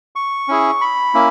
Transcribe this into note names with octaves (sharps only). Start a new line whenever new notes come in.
C#6
C#4 E4 G#4
B5
A#3 C#4 E4